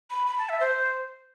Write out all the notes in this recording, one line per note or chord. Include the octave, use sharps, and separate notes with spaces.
B5
B5
A5
E5
C5